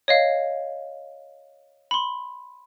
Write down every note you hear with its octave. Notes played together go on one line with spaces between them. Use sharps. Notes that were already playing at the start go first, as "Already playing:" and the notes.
C#5 D#5 F5
B5 C6